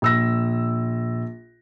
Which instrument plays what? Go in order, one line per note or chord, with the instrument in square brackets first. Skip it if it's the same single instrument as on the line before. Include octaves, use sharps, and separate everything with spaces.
[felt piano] A#1 E6 A#6